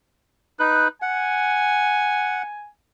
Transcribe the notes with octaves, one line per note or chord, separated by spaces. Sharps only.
D#4 B4 F#6
F#5 G#5